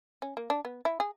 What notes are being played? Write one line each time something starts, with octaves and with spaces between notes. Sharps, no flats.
C#4
A#3
D4
B3
E4
G#4